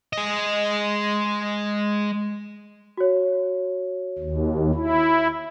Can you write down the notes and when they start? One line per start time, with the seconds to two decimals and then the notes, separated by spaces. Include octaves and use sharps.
0.13 G#3 D#5
2.97 F#4 C#5
4.19 D#2
4.75 E4